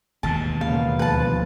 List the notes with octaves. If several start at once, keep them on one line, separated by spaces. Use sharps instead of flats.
E1 D#2 B2 A5
A#2 C#3 B3 F5
D2 F3 B4 A5